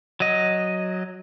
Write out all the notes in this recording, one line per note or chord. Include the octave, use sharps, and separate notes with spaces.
F#3 D#5